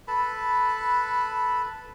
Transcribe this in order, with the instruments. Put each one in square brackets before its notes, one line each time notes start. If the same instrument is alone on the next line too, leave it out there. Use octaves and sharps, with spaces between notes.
[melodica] A4 B4 A5 B5